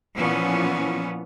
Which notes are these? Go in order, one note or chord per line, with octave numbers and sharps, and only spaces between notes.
A#2 E3 F3 B3 C#4